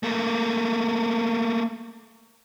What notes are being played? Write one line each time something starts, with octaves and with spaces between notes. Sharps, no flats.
A3 A#3